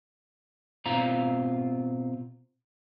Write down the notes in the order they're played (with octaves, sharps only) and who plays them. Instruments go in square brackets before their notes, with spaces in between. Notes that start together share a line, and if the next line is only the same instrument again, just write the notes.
[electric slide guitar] B2 C4 F4 F5 A#5